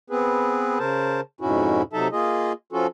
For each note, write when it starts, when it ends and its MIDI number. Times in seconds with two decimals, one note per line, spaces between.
0.10 0.79 59
0.10 0.79 60
0.10 0.79 68
0.10 0.79 71
0.79 1.21 49
0.79 1.21 70
0.79 1.21 72
0.79 1.21 81
1.41 1.82 41
1.41 1.82 44
1.41 1.82 47
1.41 1.82 61
1.41 1.82 64
1.41 1.82 66
1.93 2.08 48
1.93 2.08 54
1.93 2.08 63
1.93 2.08 69
1.93 2.08 76
1.93 2.08 81
2.12 2.52 58
2.12 2.52 65
2.12 2.52 68
2.12 2.52 75
2.73 2.87 53
2.73 2.87 61
2.73 2.87 65
2.73 2.87 66
2.73 2.87 69